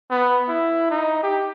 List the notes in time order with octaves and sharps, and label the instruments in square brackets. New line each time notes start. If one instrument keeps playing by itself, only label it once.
[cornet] B3
E4
D#4
G4